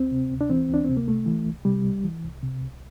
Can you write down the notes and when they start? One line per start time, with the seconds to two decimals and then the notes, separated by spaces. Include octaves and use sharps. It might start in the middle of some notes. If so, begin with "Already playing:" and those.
Already playing: D2 C4
0.11 C3
0.31 D2
0.41 D4
0.50 E3 C4
0.69 D2 D4
0.85 C3 C4
0.97 A#3
1.07 C2 A3
1.26 E3
1.46 C2
1.65 C3 G3
1.84 C2
2.04 E3
2.23 C2
2.43 C3
2.61 C2